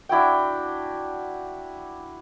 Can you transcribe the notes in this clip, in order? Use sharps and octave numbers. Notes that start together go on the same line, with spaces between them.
D4 E4 F#4 G5